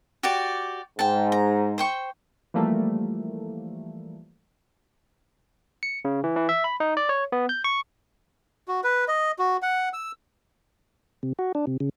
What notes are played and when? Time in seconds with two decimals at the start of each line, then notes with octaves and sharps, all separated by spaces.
0.23 F#4 G4 D5
0.99 G#2 G5 A5
1.32 A#5
1.78 C5 G5 C#6
2.54 E3 F3 G3 A3 A#3
5.83 C#7
6.05 C#3
6.24 E3
6.37 E3
6.49 E5
6.64 B5
6.80 D#4
6.97 D5
7.09 C#5
7.32 B3
7.49 G6
7.64 C#6
8.68 F#4
8.84 B4
9.08 D#5
9.39 F#4
9.62 F#5
9.93 E6
11.23 C3
11.39 F#4
11.55 D4
11.67 C3
11.80 C#3